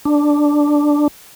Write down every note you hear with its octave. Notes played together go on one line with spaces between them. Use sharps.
D4